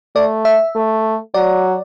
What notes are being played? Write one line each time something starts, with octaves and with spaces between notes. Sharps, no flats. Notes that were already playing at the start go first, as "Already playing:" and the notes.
A3 D5
E5
A3
F#3 D5